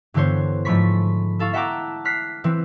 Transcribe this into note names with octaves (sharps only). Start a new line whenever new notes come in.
G2 D3 E3 B3 C5 C#5
G#2 F3 A3 B5 C#6 B6
E4 A4 F5 C#6
E5 F#5 G5 A5 A#5 D6
F6 F#6 B6 C7
E3 C4